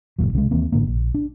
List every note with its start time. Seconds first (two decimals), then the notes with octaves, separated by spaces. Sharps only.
0.19 F#1 C#2 A#2 F#3
0.33 C2 C#3 G3 G#3
0.51 D#2 E3 A#3 C4
0.72 A1 A2 D3 A#3
0.87 A#1
1.14 D4